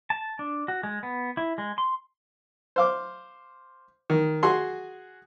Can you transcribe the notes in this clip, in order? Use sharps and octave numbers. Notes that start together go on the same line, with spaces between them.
A5
D4
F#4
G#3
B3
E4
G#3
C6
C5 F5 D6
D#3
F#4 G#4 C6